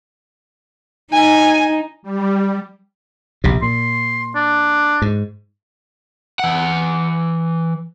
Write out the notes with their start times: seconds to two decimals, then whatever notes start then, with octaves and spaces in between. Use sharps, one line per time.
1.13 D#4 G#5
2.03 G3
3.44 A#1 C3
3.62 A#2 C6
4.36 D4
5.02 G#2
6.39 E3 F#5